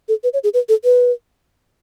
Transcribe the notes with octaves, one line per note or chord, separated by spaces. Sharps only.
A4
B4
C#5
G#4
B4
A4
B4